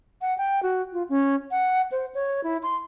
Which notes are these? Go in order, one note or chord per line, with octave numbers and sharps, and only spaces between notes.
F#5
G5
F#4
F4
C#4
F#5
C5
C#5
E4
C6